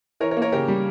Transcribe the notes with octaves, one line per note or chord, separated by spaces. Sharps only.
E3 A#4 C#5
A#4 C#5
A#3
A#4 C#5
C#3 G4 A#4
G3